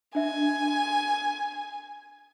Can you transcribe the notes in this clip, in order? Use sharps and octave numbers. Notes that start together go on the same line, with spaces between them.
D4 E5 G#5